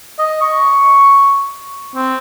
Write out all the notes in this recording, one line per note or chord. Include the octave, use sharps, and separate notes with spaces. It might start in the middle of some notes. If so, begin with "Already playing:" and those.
D#5
C#6
C4